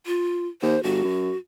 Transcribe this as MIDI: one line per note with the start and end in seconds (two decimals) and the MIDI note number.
0.06 0.47 65
0.62 0.76 39
0.62 0.83 72
0.83 1.03 31
0.83 1.37 66
1.04 1.31 42